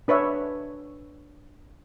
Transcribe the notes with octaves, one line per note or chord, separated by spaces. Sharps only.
D4 B4 C#5 E5